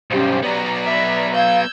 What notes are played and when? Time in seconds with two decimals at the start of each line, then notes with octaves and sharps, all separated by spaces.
0.11 B1 G2 C#4 G4 C5
0.43 F#3 B3 D5 A#5
0.85 B4 E5
1.35 F5 E6 G6 G#6